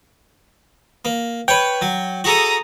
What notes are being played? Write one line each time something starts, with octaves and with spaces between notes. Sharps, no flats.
A#3
B4 C#5 G5
F#3
F#4 G#4 A4 A#5 D#6